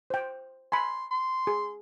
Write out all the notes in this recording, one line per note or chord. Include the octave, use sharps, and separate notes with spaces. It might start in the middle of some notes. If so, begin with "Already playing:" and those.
C5 G5
G#5 B5 C6
C6
G#4